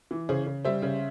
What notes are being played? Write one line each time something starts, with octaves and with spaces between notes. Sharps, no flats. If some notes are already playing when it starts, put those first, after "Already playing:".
E3
C#3 G#4 C5
C#3
G3 C5 E5
C#3